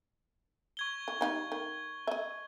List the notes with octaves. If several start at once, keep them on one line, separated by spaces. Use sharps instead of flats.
C#6 G#6 G7
E3
G3 D#4 F5
D#3
D#5 E5